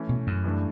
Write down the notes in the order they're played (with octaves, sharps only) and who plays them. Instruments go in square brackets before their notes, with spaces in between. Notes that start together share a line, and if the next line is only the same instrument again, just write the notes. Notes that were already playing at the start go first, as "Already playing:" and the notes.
Already playing: [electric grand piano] E3 A3 C#4
[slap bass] B2
F#2
[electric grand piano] G2 E3 A3 D4